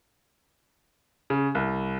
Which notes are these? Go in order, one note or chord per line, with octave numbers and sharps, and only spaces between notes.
C#3
C2